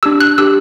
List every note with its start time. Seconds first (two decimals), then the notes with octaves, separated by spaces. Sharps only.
0.03 D4 G4 E6
0.20 F#6
0.38 D4 G4 E6